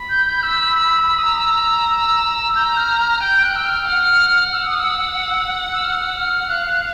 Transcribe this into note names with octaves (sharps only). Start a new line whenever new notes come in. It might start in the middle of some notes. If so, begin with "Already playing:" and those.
Already playing: B5
G6
G6
E6
D#6
A#5 E6
E6
A#5 G6
F6
F6
G5 G6
F#6
E6
F6
F#5
E6
D#6
E6
E6
F6
E6
F6
F5 F#6